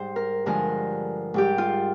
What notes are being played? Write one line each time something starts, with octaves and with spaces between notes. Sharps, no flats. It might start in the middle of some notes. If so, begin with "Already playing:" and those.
Already playing: G#2 G3 C5
A#4
G2 D3 F3 G#3 A#4
G#2 G3 G4
F4